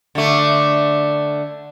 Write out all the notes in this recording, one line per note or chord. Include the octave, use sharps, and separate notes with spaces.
D3 A3